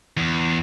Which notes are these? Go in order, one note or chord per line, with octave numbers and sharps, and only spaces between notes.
E2